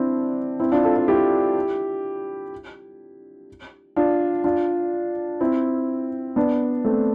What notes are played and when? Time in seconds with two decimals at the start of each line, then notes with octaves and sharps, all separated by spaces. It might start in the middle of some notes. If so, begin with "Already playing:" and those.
Already playing: C4 D4 E4
0.60 C4 E4
0.72 D4 F4
0.84 F4 A4
0.96 F4 A4
1.08 E4 G4
3.96 D4 F4
4.44 D4 F4
5.41 C4 E4
6.36 B3 D4
6.85 A3 C4